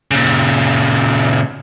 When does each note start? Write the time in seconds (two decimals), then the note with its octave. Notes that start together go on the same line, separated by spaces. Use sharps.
0.11 A#2 C#3